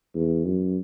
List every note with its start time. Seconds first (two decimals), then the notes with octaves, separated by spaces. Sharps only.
0.15 E2
0.46 F#2